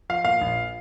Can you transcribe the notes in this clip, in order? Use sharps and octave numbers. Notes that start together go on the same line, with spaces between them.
F3 F5
A#2 F5
A#1